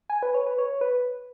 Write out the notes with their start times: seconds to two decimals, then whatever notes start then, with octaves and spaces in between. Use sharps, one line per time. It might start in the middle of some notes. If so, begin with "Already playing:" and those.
0.10 G#5
0.23 B4
0.34 C#5
0.47 B4
0.59 C#5
0.81 B4